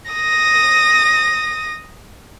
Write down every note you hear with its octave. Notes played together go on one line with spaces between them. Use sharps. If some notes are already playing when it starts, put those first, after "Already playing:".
D#6 A#6